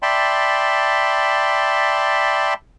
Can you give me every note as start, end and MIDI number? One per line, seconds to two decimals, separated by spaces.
0.02 2.54 74
0.02 2.54 76
0.02 2.54 79
0.02 2.54 81
0.02 2.54 83
0.02 2.54 84